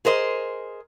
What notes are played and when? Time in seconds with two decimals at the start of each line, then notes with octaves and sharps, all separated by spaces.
0.05 G#4 A#4 C5 D#5